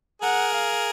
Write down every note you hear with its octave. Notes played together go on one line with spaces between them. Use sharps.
G#4 A#4 F#5
F5